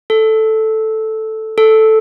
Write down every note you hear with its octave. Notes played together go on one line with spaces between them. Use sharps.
A4
A4